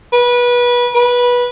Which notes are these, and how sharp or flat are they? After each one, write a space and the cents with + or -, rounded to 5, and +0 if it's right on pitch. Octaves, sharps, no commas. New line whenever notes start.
B4 -25
B4 -20